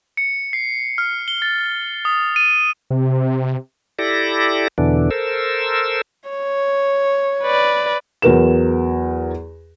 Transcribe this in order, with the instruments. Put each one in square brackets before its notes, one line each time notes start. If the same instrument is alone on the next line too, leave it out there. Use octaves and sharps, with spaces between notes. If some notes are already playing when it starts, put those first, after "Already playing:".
[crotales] C#7
C7
F6
G7
A6
D#6
D#7
[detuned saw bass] C3
[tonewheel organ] E4 G4 A4 D5 A#6
E2 B2 D3 E3 D4
A4 A#4 C5 E6
[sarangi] C#5
[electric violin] B4 D5
[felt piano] E2 F#3 A#4 B4 E7